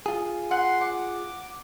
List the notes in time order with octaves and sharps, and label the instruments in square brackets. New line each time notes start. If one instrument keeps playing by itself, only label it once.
[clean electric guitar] F4 G#4
[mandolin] F#5 [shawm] C6
[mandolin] F#5 [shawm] D6